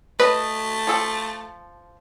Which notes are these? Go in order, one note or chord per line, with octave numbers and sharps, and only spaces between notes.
A3 B4 D#5
F3 A4